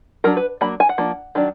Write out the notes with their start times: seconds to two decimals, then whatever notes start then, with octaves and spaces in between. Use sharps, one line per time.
0.24 F#3 D4 A#4
0.37 B4
0.61 F#3 A#3 D4 B5
0.80 G#5
0.89 F#5
0.98 F3 A#3 D4
1.35 D#3 F#3 D4